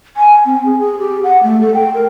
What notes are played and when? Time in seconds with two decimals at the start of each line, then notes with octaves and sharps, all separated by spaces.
0.17 G#5
0.45 C4
0.66 G#4
0.79 G#4
0.99 G4
1.24 F#5
1.43 A3
1.61 A4
1.74 G5
1.94 A#4